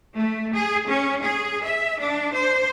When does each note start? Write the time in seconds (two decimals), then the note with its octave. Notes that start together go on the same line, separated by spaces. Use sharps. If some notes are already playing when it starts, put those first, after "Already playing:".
0.16 A3
0.53 G#4
0.87 C#4
1.22 G#4
1.63 E5
1.99 D4
2.33 C5